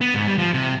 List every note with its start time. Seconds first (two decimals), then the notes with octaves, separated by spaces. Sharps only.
0.01 B3
0.15 G#2
0.27 G3
0.38 F3
0.54 C3